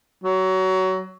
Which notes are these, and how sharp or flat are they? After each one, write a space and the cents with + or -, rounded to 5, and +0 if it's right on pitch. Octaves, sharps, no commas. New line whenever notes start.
F#3 +20